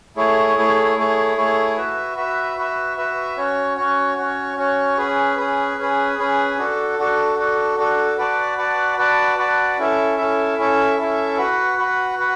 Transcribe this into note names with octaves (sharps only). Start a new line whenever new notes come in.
A3 E4 G#4 C#5
A3 E4 G#4 C#5
A3 E4 G#4 C#5
A3 E4 G#4 C#5
F#4 B4 E5
F#4 B4 E5
F#4 B4 E5
F#4 B4 E5
C#4 F#4 C#5
C#4 F#4 C#5
C#4 F#4 C#5
C#4 F#4 C#5
C#4 G#4 B4
C#4 G#4 B4
C#4 G#4 B4
C#4 G#4 B4
D4 F#4 A4
D4 F#4 A4
D4 F#4 A4
D4 F#4 A4
F#4 B4 D5 F#5 A5
F#4 B4 D5 F#5 A5
F#4 B4 D5 F#5 A5
F#4 B4 D5 F#5 A5
C#4 E4 A4 E5
C#4 E4 A4 E5
C#4 E4 A4 E5
C#4 E4 A4 E5
F#4 B4 F#5
F#4 B4 F#5
F#4 B4 F#5